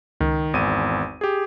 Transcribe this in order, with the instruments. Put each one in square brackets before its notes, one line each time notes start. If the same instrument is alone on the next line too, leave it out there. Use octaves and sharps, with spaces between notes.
[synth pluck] C#2 [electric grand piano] D#3
[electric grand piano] G#1 E2 D#7
G4 G#4